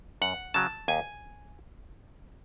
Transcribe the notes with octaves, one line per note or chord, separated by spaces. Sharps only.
F#2 F#5
C#3 F#3 A5
D#2 G#5